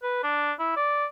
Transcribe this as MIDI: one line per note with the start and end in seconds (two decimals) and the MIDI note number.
0.03 0.22 71
0.23 0.52 62
0.59 0.76 64
0.76 1.05 74